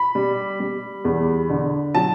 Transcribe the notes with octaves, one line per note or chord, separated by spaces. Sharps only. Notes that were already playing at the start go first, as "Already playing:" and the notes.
Already playing: B5
G3
G3
E2
D3
F#3 A5